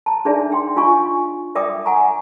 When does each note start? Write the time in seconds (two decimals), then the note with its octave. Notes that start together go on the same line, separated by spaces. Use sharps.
0.06 A5 A#5
0.25 D4 D#4 G#4 D5 E5
0.51 D4 G5 C6
0.76 D4 F4 D#5 F5 G#5 C#6
1.55 D5 E5 G5 D6 D#6
1.85 E5 F#5 G#5 A#5 C#6